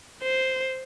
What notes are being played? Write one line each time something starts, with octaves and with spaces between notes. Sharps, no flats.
C5